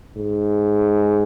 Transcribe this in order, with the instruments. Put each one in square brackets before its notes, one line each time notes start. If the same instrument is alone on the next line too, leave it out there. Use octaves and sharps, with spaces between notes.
[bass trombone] G#2